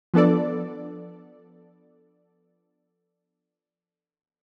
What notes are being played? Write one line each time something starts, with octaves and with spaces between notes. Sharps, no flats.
F3 B3 D4 A4 D5